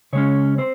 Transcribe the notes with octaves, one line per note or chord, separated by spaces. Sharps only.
C#3 G#3 C#4 C#5
C4 C5